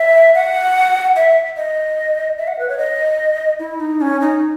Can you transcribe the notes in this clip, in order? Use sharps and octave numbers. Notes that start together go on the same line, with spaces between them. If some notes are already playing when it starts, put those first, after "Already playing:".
Already playing: E5
F#5
E5
D#5
E5
F#5
B4
C#5
D#5
E4
D#4
C#4
D#4